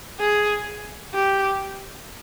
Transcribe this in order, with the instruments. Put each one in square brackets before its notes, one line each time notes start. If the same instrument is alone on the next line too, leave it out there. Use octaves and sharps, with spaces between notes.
[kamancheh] G#4
G4